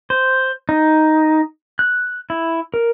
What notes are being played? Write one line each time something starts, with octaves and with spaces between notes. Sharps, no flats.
C5
D#4
F#6
E4
A#4